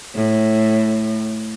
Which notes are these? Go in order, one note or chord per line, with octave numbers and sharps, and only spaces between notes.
A2